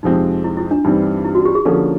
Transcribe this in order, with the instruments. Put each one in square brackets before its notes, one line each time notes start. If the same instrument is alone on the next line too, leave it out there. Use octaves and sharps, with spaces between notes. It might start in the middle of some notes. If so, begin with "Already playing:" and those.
[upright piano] F2 C3 F3 G#3 C4 [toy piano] D#4
[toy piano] E4
E4
D4
[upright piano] G2 E3 G3 C4 [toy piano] D#4
[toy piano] E4
F#4
G4
G#4
[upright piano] D3 F3 A#3 C#4 [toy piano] A4